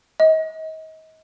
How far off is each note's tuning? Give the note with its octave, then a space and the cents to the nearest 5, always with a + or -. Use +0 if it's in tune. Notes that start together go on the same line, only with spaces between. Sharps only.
D#5 +35